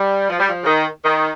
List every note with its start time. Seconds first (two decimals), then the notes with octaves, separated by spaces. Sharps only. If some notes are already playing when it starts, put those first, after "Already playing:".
Already playing: G3
0.29 F3
0.40 G3
0.49 F3
0.61 C#3
0.66 D#3
1.04 D#3